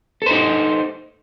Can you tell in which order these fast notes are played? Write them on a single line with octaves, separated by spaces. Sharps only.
A4 C5 D#4